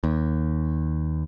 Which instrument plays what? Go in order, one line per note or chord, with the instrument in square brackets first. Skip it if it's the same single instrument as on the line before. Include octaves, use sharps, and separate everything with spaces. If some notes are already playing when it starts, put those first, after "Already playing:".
[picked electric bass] D#2